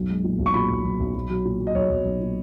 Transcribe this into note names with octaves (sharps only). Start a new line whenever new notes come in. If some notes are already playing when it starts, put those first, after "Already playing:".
Already playing: B1 F#2
G#3
A#2
B1
C#6
A#2 B5
B1
B1
B1
B1
F#3
A#2
F#3
D#5
B1 C#5
B1
B1
A#2